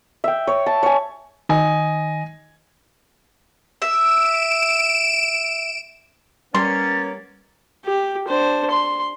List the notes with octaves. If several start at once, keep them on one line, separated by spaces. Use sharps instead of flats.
E5 G5
C#5
A5
C#5 G#5
D#3 D#5 G#5
E5 D7 E7
G3 A#3 B3 C#4 C6 A6
G4
D4 C5
C6